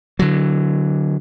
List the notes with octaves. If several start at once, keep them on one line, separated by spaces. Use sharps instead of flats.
D3 F#3